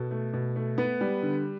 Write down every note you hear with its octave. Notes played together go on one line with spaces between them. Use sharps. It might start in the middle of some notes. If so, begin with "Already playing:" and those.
Already playing: B2 A4
A3
B2
A3
B3 B4
G3
D3